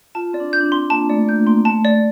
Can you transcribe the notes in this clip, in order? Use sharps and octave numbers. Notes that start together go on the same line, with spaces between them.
F4 A5
C4 D5
D4
G6
D4
C4
C6
A#3 A5
A3 D5
A#3 G6
A#3 C6
A3 A5
A3 D5